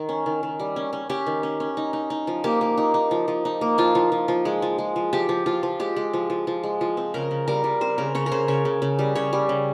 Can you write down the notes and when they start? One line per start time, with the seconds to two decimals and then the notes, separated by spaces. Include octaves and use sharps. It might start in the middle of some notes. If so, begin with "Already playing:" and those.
Already playing: D#3
0.09 C#4
0.26 D#3
0.43 D#3
0.60 G3
0.76 C#4
0.93 C#4
1.09 C#4 G4
1.26 D#3
1.43 C#4
1.60 C#4
1.77 D#4
1.93 D#4
2.10 D#4
2.27 F3
2.44 A#3 G4
2.61 A#3
2.78 D#4
2.94 D#4
3.11 F3
3.28 F3
3.45 D#4
3.61 A#3
3.78 F3 F4
3.95 F3
4.12 F3
4.28 F3
4.45 G#3
4.62 F3
4.78 G#3
4.96 F3
5.13 F3 G4
5.29 F3
5.46 F3 F4
5.63 F3
5.79 G#3 G4
5.96 G#3
6.13 F3
6.30 F3
6.47 F3
6.63 G#3
6.81 F3
6.97 C4
7.14 C#3 A#4
7.31 C#3
7.48 G3 A#4
7.64 G3
7.81 C4 C5
7.98 C#3 A#4
8.15 C#3 C#5
8.26 A#4
8.32 C#3 C5
8.48 C#3 C#5
8.65 C#3
8.82 C#3
8.99 G3
9.15 C#3 C#5
9.33 G3
9.49 C#3